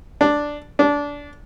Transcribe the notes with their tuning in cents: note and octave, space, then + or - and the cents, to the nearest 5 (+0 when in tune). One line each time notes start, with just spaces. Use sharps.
D4 +0
D4 -20